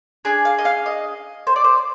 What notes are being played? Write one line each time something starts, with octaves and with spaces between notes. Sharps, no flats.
D4 G#4 G#5
F5
D#5
F5
D#5
C5
D5
C5